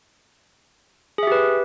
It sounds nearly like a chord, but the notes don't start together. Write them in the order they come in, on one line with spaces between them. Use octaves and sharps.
G#4 E5 G4 B4